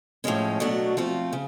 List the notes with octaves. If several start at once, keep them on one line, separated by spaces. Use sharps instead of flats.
A2 F3 G#3 C#4
B2 F#3 A3 D4 F#4
F3 A3 C4 F4
C#3